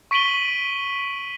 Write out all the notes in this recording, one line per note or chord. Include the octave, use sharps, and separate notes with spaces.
C#6 B6 D7 D#7 F#7 G7